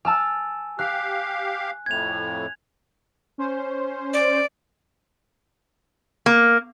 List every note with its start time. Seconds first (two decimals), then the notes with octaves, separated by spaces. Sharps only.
0.05 G#5 A5 E6 F6
0.79 G4 F5 F6 F#6
1.86 F2 A2 G#6 F7
3.38 C#4 C5
4.14 D5
6.26 A#3